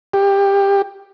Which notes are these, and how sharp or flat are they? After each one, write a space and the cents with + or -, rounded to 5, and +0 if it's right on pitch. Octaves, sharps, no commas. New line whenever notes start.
G4 +20